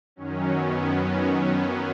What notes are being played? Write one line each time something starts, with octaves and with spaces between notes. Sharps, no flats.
F#2 D#3 F#3 C#4
B3
C#4